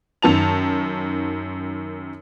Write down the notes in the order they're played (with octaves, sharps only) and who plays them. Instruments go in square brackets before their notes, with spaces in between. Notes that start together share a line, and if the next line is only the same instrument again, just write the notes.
[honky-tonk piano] F#2 D#3 A5 F7